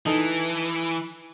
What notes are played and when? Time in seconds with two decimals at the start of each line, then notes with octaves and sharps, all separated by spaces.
0.06 E3 D#4 A4